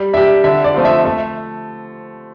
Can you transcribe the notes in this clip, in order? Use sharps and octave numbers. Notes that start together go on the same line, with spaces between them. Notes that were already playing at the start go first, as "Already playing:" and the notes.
Already playing: G3
D4 G4 E5
D3 E5
D5
F3 A3 C4 F4
E5
A3 E5